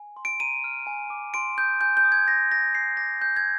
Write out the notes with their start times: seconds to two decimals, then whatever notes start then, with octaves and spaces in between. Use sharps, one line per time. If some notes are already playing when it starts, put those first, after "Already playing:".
Already playing: G#5
0.17 C6
0.25 D7
0.40 A#5 D#7
0.64 F6
0.87 G#5
1.10 D6
1.34 C6 D7
1.58 D#6 G6
1.81 G#5 G6
1.97 G6
2.05 D#6
2.12 G#6
2.27 G#5 A#6
2.50 C6 A#6
2.75 G#5 C7
2.97 D6 A#6
3.21 G#5 G6
3.37 G#6